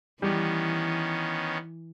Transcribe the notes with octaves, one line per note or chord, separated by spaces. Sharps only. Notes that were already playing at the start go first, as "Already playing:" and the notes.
D#3 E3 G3 B3 C#4